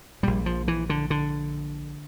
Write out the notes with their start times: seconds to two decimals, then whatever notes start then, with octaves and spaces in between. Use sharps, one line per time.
0.23 A#1 A#2 G3
0.46 F3
0.68 E3
0.90 D3
1.10 D3